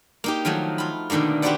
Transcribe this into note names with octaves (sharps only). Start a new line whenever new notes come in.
A#3 D#4 G4
D#3 F3 F#3 A3
F4 B5
B2 D3 D#3 A3 A#3
F#4 G4 B4 C5 D5 F#5